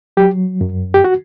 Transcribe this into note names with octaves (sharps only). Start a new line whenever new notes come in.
F#3 G4
F#2
G4
F#4